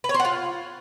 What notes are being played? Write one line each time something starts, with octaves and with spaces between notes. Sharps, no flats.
B4
C#5
C5
F#5
F4